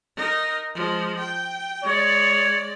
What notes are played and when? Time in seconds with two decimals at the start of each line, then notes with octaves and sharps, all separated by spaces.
0.17 D#4 A#4
0.75 F3 G#3
1.19 G5
1.83 G#3 C#5 D5